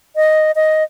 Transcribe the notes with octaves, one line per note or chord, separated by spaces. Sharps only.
D#5
D#5